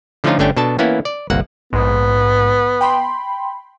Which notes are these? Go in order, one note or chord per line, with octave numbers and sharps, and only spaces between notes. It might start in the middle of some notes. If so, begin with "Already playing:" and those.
D3 F3 A3 C#4 D#4 F4
G1 D3 A3 C#4 D4 G5
B2 D4 A4 A5
E3 A#3 B3 C#4 E4
D5
G1 C2 A#3 F#5
A#1 G#2 B3
G5 B5 C6